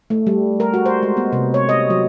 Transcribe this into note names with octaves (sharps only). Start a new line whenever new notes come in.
A3
G3
A#4
F#4
C5
G#3
B3
C3
C#5
D#5
F#3